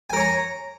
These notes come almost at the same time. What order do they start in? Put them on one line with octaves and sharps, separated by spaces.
G#5 A#4 C#5 A#5